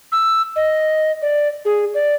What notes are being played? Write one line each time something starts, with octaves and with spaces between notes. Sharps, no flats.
E6
D#5
D5
G#4
D5